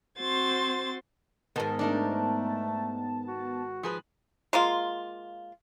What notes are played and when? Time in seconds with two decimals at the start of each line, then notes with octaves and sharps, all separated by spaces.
0.19 C4 F#4 C5 C6 A6
1.56 G#2 D#3 B3 A5
1.79 A3 D4 D#4 A#4
3.27 F#4
3.83 F3 G#4 B4
4.53 G#3 A#3 F4